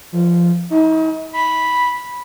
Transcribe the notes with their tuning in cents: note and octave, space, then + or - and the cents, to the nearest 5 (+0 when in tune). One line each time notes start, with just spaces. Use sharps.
F3 -10
D#4 +40
B5 -5